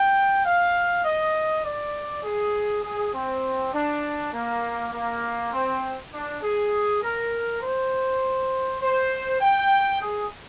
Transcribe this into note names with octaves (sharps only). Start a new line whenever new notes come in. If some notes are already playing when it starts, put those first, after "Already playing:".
Already playing: G5
F5
D#5
D5
G#4
G#4
C4
D4
A#3
A#3
C4
D4
G#4
A#4
C5
C5
G5
G#4